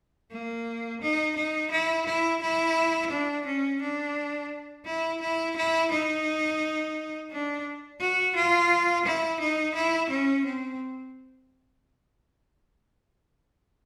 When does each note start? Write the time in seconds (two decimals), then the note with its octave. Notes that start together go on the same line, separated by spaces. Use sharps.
0.31 A#3
1.02 D#4
1.36 D#4
1.71 E4
2.06 E4
2.41 E4
3.11 D4
3.46 C#4
3.81 D4
4.85 E4
5.21 E4
5.56 E4
5.91 D#4
7.31 D4
8.00 F#4
8.35 F4
9.05 E4
9.40 D#4
9.75 E4
10.10 C#4
10.45 C4